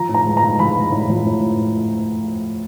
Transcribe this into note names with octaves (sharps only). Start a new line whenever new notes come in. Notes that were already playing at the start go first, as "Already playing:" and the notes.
Already playing: F3 A#5
A2
A#5
G#3
A#5
G#3
F3 B5
G#3
A2
F3
A2